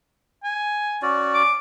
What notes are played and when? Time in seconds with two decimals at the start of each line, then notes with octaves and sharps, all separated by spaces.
0.44 G#5
1.02 C#4 F#4 D5
1.34 D6